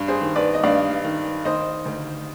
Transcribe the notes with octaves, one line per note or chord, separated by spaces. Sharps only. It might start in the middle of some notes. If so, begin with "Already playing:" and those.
Already playing: G2
G#4 C5
D#3
B4 D5
D#5
G2 D5 F5
D#3
D#3 C5 D#5
D2